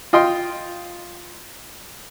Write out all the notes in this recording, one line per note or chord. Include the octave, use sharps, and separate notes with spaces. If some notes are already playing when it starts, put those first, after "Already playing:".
F4 D#5 G5 C6